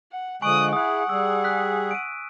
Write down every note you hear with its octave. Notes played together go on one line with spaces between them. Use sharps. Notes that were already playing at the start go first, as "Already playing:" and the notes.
F#5
D3 F3 G#3 G#5 C#6 D#6 F#6 D7
E4 G#4 F#5 D#6 F#6
G3 G#4 E6
F#6 B6
D7 D#7